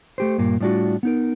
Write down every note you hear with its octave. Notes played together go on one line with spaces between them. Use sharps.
A3 G4 C5
G2 A#2 A#3
A2 G3 D4 F4 F#4
B3 D#4 A#4